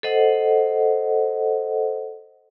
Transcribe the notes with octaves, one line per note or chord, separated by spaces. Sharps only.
A4 C5 D#5 F#5